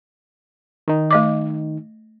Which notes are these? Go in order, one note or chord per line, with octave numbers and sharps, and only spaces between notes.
D#3 D#4
A3 D#5 D6